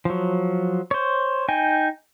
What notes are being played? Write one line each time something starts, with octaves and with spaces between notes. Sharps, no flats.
F3 F#3
C5 C#5
D#4 G5 G#5